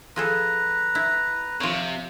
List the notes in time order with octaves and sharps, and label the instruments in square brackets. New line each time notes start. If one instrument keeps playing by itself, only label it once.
[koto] F3 G#4 A4 [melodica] B4 A#5
[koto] E4
[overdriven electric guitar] C3 [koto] F3 C#5